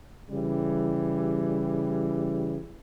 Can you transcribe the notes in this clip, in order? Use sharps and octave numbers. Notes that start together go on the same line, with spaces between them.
C#3 E3 G3